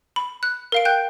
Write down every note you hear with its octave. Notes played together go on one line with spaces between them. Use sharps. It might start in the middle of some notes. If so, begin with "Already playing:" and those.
B5
F#6
A#4 F5 D7
G5 F#6 G6